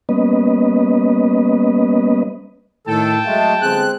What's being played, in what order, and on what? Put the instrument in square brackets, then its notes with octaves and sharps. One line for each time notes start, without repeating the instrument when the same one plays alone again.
[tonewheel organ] G3 A#3 B3 C#4 B4 D#5
[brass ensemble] A2 [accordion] D#3 A4 [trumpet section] G5 A5
[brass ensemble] F#3 G#4 F5 [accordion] G#3 A3
[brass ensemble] G1 [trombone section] G#3 C4 G#4 [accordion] F#6